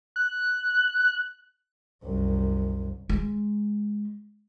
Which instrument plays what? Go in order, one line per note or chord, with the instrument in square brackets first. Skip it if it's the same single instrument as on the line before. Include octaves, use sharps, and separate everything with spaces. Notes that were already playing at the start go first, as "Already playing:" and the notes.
[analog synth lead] F#6
[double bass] C2 F#2
[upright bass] G#3